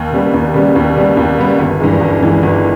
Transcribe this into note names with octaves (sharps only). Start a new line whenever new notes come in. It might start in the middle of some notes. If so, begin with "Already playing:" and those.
Already playing: D#2
C#3 G3 B3
D#2
C#3 G3 B3
D#2
C#3 G3 B3
D#2
C#3 G3 B3
G1
G2 E3 G#3
G1
G2 E3 G#3
G1